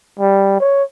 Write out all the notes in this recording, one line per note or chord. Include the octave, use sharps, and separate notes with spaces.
G3
C#5